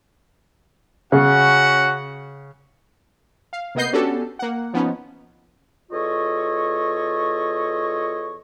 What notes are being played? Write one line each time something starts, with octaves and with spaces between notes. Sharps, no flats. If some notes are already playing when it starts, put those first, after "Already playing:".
C#3 C#4 F#4 F#5
F5
C3 A#3 B3 D#5 G6 C7
B3 C#4 D4 F#4 G4 A4
A#3 F#5
F3 B3 C#4 D#4
E2 F4 A4 C#5 D#5 C#6